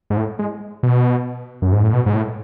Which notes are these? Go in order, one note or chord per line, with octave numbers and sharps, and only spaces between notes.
G#2
A2
G#3
B2
F#2
G#2
A2
B2
G#2
A2